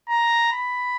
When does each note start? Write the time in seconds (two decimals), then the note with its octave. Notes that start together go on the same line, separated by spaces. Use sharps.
0.09 A#5
0.52 B5